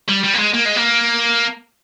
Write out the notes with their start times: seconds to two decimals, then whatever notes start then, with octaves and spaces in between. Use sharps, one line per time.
0.09 G3
0.24 G3
0.34 A#3
0.39 G#3
0.54 A#3
0.66 G#3
0.76 A#3